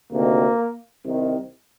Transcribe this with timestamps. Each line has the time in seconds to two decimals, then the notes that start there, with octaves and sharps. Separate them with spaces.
0.12 D2 C3 D#3 A#3
1.04 C2 C3 D#3